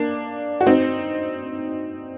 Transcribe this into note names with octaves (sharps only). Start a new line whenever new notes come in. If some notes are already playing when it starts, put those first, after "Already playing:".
Already playing: A#3 D4
F#4
C4 D#4